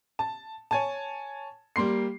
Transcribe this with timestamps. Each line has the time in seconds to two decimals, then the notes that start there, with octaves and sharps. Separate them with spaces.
0.19 A5
0.71 C#5 G#5 A5
1.76 G3 A#3 C6 C7